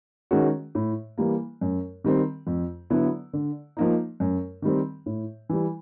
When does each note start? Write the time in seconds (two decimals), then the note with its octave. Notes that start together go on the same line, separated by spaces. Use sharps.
0.31 D#3 G#3 C#4 F#4
0.75 A2
1.18 E3 G3 A#3
1.61 F#2
2.04 D#3 G3 C4
2.47 F2
2.90 D3 F#3 B3 E4
3.33 D3
3.77 F3 A#3 D#4
4.20 F#2
4.62 D#3 G3 C4
5.06 A2
5.49 E3 G3